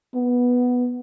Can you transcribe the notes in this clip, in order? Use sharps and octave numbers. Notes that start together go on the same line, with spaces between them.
B3